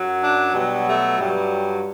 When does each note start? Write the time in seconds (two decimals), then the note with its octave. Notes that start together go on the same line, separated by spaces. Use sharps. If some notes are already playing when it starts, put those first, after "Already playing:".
Already playing: F#2 F#3
0.21 D4
0.54 B2 F#3 G3
0.87 A3
1.20 G2 F#3 G3